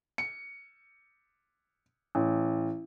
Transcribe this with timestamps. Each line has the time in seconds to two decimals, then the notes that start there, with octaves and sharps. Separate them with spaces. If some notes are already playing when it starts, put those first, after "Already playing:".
0.18 C#7
2.15 A1